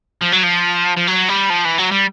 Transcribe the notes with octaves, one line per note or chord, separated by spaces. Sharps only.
F3
F#3
F3
F3
F#3
G3
F3
E3
F#3
G3